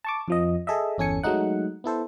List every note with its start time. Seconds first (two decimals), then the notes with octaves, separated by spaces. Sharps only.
0.04 A5 C#6 D6
0.28 F2 F3 D#5
0.67 G#4 A4 D#5 E5
0.98 G1 E2 C#4 A4 G#5 C#7
1.23 F#3 G#3 A3 D#4 F#5
1.84 B3 E4 A4 C5